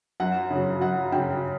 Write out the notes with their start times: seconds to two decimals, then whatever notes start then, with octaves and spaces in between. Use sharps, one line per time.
0.20 F#2 F#5
0.50 C#3 F#3
0.81 F#2 F#5
1.12 C#3 F#3 G5